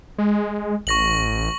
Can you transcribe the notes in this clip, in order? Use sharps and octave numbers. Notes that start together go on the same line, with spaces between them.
G#3
A1 C#6 A#6 F#7